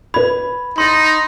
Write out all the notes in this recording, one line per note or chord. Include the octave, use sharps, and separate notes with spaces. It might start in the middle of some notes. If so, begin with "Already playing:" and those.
B4 B5 G#6
D#4 C6 D#6 A6